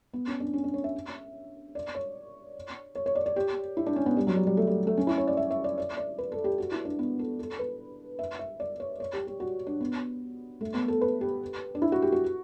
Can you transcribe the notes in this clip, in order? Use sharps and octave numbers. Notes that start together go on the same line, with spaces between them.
B3
C#4
D4
C#4
D4
C#5
E5
D5
C#5
C#5
C#5
D5
D5
G4
E4
D4
C#4
B3
G3
F#3
G3
G3
A3
G3
A3
C#4
E4
C#5
D5
E5
E5
D5
D5
D5
B4
A4
G4
F#4
E4
D4
B3
A4
A4
B4
E5
E5
D5
C#5
C#5
G4
G4
F#4
D4
B3
A3
B3
A4
B4
G4
D4
E4
F#4
G4
F#4